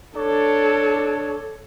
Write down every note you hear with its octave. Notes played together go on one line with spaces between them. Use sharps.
D4 A4 C#5